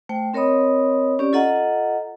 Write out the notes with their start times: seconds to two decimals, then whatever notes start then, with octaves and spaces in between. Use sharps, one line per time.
0.09 A3 C5 G5
0.34 C4 A#4 C#5 D#5 B5 D#6
1.19 C#4 G4 D5
1.33 F4 A4 D#5 F#5 A#5